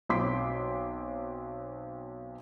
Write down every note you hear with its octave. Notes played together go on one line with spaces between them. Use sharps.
B1 C4 C6 D6 B6